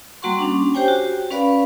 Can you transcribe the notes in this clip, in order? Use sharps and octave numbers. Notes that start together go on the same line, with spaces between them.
G3 A#3 F#4 F#5 C6 C#6
C#4 D4
G4 C5 C#5 G5 G#5
F#4
C#4 B4 D5 F5 B5